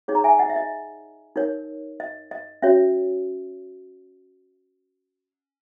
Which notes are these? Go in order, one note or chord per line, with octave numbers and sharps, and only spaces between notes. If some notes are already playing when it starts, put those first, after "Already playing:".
D#4 G#4 C#5
A#5
E5 G#5
D#5 F#5
E5
D#5
D#4 A#4 C#5
D#5
D#5
C#4 F#4 C#5 E5